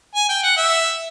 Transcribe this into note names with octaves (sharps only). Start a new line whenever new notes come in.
G#5
G5
F#5
E5